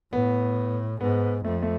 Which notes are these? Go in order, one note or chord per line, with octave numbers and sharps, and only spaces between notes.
A2 B3
G#2 B3
F2 A3
A3